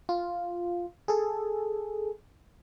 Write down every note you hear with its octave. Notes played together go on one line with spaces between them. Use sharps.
F4
G#4 A4